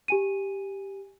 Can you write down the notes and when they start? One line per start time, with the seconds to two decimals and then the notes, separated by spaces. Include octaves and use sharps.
0.08 G4 G#5 D#7